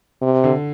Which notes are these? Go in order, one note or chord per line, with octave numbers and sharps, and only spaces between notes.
C3
D3